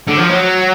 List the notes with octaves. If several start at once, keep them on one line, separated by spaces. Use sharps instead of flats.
D3
F3
F#3